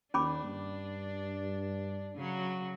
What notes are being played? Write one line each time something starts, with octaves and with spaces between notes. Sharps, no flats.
D#2 C#4 D4 B5 D6
G2
C#3 F#3